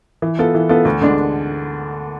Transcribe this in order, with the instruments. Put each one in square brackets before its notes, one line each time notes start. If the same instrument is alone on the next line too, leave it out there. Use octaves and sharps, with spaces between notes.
[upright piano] E3
B3 F4 A4
E3
B3 F4 A4
D2
D3 G#3 D4